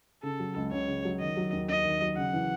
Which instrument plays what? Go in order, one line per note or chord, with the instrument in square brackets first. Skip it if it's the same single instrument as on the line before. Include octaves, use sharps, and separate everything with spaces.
[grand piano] C#3 [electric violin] A4
[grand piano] F#3
C#2
[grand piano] C#2 [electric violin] C#5
[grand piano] C#3
F#3
[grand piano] D#3 [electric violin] D#5
[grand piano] F#3
D#2
[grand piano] D#2 [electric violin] D#5
[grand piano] D#3
F#3
[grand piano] C#3 [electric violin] F#5
[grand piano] E3